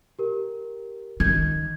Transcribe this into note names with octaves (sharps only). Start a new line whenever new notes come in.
G4 A#4
D#3 G6 G#6